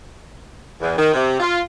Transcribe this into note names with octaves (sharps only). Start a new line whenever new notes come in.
E2
D#3
C3
F4